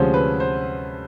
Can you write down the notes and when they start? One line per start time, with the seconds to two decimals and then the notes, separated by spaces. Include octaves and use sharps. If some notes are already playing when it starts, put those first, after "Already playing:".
Already playing: D2 C3 F3 G#3 C#4 C5
0.14 B4
0.40 C5